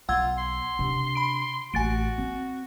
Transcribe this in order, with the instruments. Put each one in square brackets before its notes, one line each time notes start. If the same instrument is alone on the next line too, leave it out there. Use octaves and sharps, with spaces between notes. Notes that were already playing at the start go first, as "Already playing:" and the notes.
[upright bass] B1 [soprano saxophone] F4 [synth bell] F#5 E6 G#6
[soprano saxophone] C6
[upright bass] C3 D4
[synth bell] B5 D7
[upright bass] A1 [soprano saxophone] F#4 [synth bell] G#5 A6 D7
[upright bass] C4